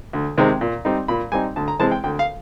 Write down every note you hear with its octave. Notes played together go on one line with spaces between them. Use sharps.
D2
C3 D#3 G#3 C4
A#2
G3 C4 D#4
A#2 B5
G3 C4 D#4 G#5
D2 A5
A#5
C3 E3 G#3 C4 A5
G5
D2 G5
F5